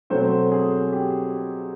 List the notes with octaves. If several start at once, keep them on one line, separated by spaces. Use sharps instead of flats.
B2 F#3 A3 C4 C5
G#4
G4